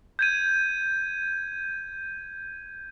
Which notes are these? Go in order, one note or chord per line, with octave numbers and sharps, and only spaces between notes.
G6 G#6 D#7